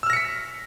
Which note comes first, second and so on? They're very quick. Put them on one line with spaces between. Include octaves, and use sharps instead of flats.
E6 F6 A#6 C#7 B6